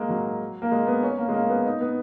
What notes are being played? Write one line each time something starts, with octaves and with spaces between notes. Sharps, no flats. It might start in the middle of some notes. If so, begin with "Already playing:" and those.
Already playing: G#3 A#3
F#3
A#3
G#3
B3
C#4
A#3
G#3
A#3
B3
D#4
B3